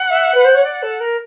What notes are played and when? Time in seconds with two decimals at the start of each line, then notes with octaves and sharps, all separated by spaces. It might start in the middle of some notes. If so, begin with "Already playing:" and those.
Already playing: F#5
0.10 E5
0.34 B4
0.44 C5
0.54 C#5
0.64 D5
0.82 A4
1.00 A#4